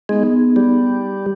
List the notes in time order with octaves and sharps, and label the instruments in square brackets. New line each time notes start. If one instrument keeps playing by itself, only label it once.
[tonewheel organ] G#3 [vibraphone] B3 D#4 G#4
[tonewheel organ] G3